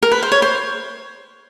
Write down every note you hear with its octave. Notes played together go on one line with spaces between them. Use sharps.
A#4
B4
C5
C#5
C5